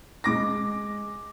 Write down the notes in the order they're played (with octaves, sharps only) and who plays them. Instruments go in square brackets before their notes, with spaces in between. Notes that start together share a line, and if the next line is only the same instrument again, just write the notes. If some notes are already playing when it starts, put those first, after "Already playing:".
[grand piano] G#3 D6 A#6